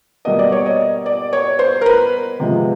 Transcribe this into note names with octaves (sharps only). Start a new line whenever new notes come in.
B2 G3 A#3 D#5
D5
C#5
D#5
D5
C#5
C5
A#4
B4
C3 F3 G#3 B3